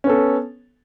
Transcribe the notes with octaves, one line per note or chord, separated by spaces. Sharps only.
B3 C#4 A4